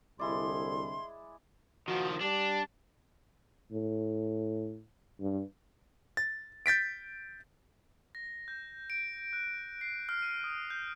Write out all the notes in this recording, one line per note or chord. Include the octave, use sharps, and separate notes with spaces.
C2 D3 G#3 E4 D5 C6
D#3 F3 F#4
G3 D4
A2
G2
A6
G6 A6 B6 D7
A#6
G6
D7
F#6
C7
F6
D#7
D#6
G6